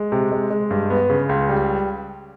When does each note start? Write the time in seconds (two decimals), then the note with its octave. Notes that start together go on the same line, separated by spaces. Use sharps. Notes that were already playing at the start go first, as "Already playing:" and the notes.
Already playing: G#3
0.12 C3
0.31 G#3
0.51 G#3
0.71 G2
0.90 B3
1.10 C#3
1.29 C#2
1.49 G3